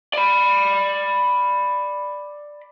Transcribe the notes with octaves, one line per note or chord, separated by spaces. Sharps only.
D5 B5